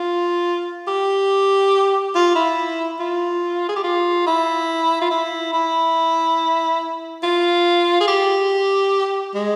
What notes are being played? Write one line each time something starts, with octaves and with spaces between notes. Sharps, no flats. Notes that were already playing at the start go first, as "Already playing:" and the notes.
Already playing: F4
G4
F4
E4
F4
G#4
G4
F4
E4
F4
E4
E4
F4
G#4
G4
G#3